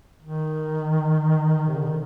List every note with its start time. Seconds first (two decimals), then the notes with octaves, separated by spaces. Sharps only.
0.22 D#3
1.68 C3
1.77 D3
1.86 D#3